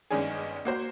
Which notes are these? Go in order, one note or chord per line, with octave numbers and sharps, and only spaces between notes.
G1 D#3 G#3 C#4 D4 G#4
A#3 F#4 C5